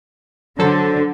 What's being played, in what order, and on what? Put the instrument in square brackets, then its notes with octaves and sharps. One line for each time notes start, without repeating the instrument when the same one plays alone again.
[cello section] D3 [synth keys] F#3 A4 C5